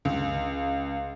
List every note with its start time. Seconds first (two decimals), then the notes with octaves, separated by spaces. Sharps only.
0.05 C#2